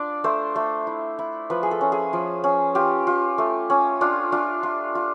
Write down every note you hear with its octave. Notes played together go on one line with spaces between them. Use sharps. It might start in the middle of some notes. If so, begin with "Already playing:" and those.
Already playing: D4 F4 D5
A3 C5
A3
E4
E4
F3 B4
G#4
A4
C#4
G#4
F3
C#4
F4 G4
F4
A3
C#4
D4 F4
D4 F4
F4
F4